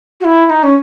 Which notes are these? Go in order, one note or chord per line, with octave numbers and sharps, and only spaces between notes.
F#4
E4
E4
D#4
C#4